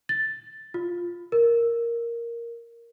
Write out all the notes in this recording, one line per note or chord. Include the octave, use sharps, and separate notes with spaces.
A6
F4
A#4